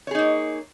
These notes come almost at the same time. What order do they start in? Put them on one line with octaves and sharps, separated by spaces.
C#5 G#4 D#4 A#3